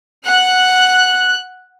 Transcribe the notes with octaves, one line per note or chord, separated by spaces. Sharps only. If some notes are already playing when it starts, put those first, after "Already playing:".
F#5 F#6